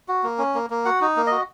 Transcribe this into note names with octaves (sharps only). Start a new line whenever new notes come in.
F#4
A#3
C#4
A#3
A#3
F#4 F#5
D#4
A#3
D#5
F#4